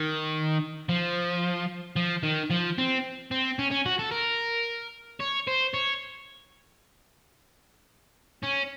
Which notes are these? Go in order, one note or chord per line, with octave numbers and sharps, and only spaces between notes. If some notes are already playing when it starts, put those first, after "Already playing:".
Already playing: D#3
F3
F3
D#3
F3
C4
C4
C#4
C#4
F#4
A4
A#4
C#5
C5
C#5
C#4